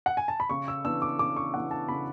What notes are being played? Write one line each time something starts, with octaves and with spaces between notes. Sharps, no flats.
F#5
G#5
A5
B5
C#3 C#6
E6
E3 B3 D4 E6
D6
C#3 D6
C#6
E3 B3 D4 F#5
A5
C#3 B5